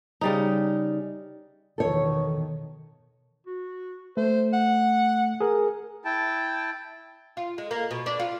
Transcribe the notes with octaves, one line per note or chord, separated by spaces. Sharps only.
C#3 G3 D#4
E2 B2 D#3 A4 C#5
F#4
A3 C5
F#5
G#4 A#4
E4 G5 A5
F4
G#3
A#3
B2
D4
F4